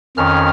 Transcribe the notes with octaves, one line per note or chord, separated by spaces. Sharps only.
F2 D#3 C#4 F6